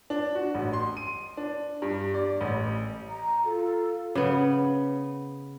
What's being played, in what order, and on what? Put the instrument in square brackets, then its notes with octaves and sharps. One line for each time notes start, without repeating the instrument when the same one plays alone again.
[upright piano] D4
F#4
A1
C6
D#7
D4
G2
D5
A1
[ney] A#5
[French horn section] F4 [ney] A4
[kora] C#3 B3